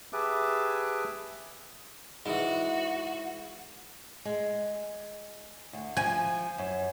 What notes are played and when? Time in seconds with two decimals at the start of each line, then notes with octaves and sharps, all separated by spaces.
0.13 G4 G#4 B4 E5 A5 D6
2.26 G#2 E3 F#4
4.25 G#3
5.73 D2
5.97 F3 G#5
6.58 F#2